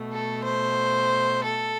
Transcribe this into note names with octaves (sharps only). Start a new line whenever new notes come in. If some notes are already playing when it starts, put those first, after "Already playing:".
Already playing: B2 A3
A4
C5
A4